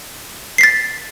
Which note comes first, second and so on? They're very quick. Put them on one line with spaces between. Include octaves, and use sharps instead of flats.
C7 B6 A6